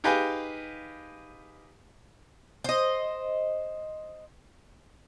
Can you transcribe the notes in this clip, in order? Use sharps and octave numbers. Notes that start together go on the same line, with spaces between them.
D#4 G4 G#4 B4 F5
C5 D#5